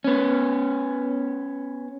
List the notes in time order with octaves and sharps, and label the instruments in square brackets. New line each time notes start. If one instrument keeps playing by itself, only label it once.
[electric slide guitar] B3 C#4